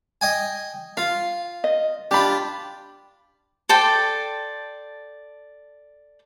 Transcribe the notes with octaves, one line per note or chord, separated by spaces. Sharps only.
D#5 G5 G#5
F4 F5
D#5
D4 F4 G4 B5
A4 C5 D5 G5